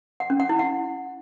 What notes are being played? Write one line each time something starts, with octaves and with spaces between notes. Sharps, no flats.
F#5
C#4
F#5
E4
F#5